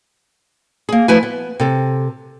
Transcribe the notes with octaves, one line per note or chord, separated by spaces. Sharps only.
A#3 G#4
F3 A3 E4 B4 E5 G#5
B3
C3 A4